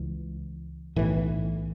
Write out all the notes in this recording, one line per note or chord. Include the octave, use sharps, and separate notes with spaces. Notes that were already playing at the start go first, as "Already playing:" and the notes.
Already playing: C#2 C#3 E3
B1 A2 E3